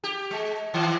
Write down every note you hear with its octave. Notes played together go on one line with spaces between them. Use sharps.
G4
G#3
D#3 E3